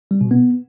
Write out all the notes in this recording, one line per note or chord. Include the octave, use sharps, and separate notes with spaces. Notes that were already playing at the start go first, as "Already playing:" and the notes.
G3
B2
B3